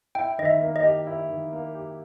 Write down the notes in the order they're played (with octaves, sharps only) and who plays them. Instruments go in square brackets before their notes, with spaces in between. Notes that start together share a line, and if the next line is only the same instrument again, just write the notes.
[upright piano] E4 [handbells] G5
[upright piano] D#3 [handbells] D#5
[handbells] E5
[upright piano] A#3
[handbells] D#5
[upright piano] G4
E4
D#3
A#3
G4